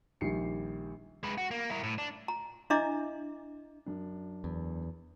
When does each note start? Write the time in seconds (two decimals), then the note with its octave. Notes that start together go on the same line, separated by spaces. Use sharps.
0.21 A#1 D#3 G3 G4 C7 C#7
1.23 G#3 B4
1.38 F#4
1.51 A#3
1.70 E4 A#4
1.84 A2
1.98 D4
2.28 A#5
2.70 D4 E4 D#5 E5 A#5 D6
3.86 F#2 D4
4.44 E2